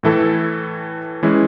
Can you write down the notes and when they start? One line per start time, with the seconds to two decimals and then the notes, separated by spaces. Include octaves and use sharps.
0.03 A2 E3 A3 E4 A4
1.23 E3 G#3 C#4 E4